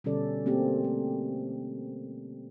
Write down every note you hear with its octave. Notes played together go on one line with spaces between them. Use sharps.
B2 D3 G3 C#4 A4 D5
A3 A#3 C4 G4
A3